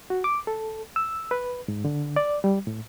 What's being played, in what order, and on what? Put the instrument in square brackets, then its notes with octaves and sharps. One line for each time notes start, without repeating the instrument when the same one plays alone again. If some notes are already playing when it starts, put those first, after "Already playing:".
[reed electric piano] F#4
D6
A4
E6
B4
G#2
D3
D5
G3
A2